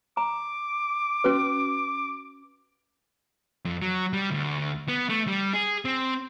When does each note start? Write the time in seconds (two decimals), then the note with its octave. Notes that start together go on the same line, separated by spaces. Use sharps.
0.17 A#5 D6
1.24 C#4 F#4 B4
3.65 F2
3.82 F#3
4.13 G3
4.30 D2
4.88 B3
5.09 A3
5.27 G3
5.53 G#4
5.85 C4